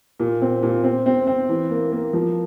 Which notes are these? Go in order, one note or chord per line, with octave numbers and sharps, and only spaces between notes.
A#2
C4
A#2
C4
C4
C4
E3
A#3
A#3
F3